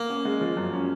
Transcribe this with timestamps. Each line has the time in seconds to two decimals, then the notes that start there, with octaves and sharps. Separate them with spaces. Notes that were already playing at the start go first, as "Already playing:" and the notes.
Already playing: A#3
0.10 C#4
0.25 G#3
0.41 F3
0.57 F#2
0.73 C#4